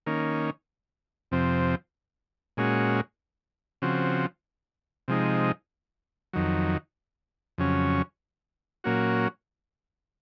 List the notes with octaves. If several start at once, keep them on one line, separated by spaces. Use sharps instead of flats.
D#3 A#3 C#4
F2 C3 F3 C4
A#2 G#3 C#4 F#4
C#3 F3 C4 F#4
C3 F3 G#3 D#4
F2 D#3 F#3
F2 C#3 F#3 C#4
A#2 F#3 A#3 C#4 F#4